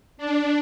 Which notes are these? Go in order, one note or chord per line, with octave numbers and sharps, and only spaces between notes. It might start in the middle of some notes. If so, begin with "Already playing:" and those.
D4